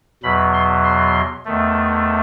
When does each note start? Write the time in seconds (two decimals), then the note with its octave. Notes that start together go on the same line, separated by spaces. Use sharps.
0.23 E2 B2 F#3 B5
0.53 C6
0.84 C6
1.45 E2 D#3 A3